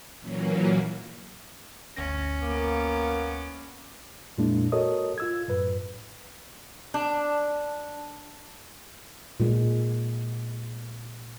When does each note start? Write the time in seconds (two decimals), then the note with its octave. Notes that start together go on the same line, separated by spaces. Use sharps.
0.20 A#2 E3 F#3 A#3 C#4
1.96 G1 D2 C#4 A#6
2.42 A#3 B3 D6
4.38 F2 A#2 G#3 A#3 D4 E4
4.72 F#4 A4 A#4 C#5 D#5 D#6
5.18 F4 E6 G#6
5.48 F#2 A2 B4
6.94 D4
9.40 A#2 G#3